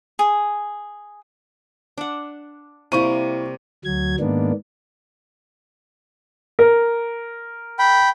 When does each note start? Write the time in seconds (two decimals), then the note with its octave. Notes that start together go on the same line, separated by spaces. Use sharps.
0.19 G#4
1.98 D4 F#5
2.92 C3 G3 A#3 E4 C#6 D#7
3.85 D2 F#3 G#6
4.20 G#2 D#3 A#3 B3 D4
6.59 A#4
7.79 G5 B5